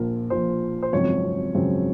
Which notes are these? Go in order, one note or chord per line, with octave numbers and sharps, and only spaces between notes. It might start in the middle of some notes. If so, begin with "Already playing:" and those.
Already playing: A#1 A#2 F3 A#4
A#1 A#2 F3 C5
C5
G#1 F#2 C#3 F3 C4 C#5
G#1 F#2 C#3 F3 C4